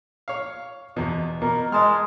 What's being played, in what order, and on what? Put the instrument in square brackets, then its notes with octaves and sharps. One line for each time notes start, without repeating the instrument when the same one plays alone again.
[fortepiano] C#5 F5
E2 B2
[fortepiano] B2 [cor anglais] A#4
[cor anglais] G#3 [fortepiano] D#5 A5 F6